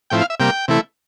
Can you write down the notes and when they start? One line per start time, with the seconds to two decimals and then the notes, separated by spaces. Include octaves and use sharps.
0.10 A2 F3 C4 E4 G5
0.21 F5
0.30 E5
0.40 C3 G3 A#3 G5
0.68 C3 E3 A3 E4